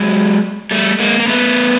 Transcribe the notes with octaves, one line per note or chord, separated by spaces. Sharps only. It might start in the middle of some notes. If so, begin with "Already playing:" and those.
Already playing: F#3 G#3
G3 A3
G#3 A#3
A#3
A3 B3